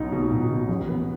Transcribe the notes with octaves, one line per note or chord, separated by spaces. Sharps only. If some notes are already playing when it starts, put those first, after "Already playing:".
Already playing: B1 B2 D#4
B2
B1
B2
A1
B3